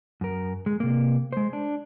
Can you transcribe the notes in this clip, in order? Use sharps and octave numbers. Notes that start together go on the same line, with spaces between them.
F#2 A#4
G#3
C3 A#3
G#3 C5
D4